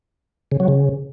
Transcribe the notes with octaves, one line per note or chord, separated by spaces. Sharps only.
C#3
F#3
C#3